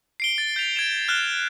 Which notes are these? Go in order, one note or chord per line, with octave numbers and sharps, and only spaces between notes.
C7 D7 G7
A6
G6 B6 F7
G#6 D7 E7
F6 F#6 E7 G7